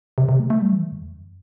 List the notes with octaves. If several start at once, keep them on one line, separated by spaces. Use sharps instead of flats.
C3
C3
A3
A3
G3
E3
D3
F#2
E2
F#2